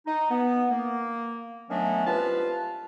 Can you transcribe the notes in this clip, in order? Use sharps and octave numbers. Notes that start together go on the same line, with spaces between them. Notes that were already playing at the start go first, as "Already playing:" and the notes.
D#4
B3
A#3
D#3 F#3 A3 B3 C#4 D4
C2 F4 B4 F5 A5